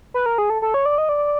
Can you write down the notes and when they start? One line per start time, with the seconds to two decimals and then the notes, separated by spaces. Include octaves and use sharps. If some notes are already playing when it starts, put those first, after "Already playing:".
0.14 B4
0.26 A#4
0.38 G#4
0.50 A4
0.62 A4
0.74 C#5
0.86 D5
0.98 D#5
1.09 D5